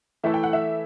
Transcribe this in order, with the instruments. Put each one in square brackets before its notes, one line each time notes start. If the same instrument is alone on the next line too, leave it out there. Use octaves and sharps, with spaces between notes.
[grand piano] E3 A3 E4 A4 [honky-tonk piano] E5
[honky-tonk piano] G5
F#5
E5